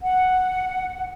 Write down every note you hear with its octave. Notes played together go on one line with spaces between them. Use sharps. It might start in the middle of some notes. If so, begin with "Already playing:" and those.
F#5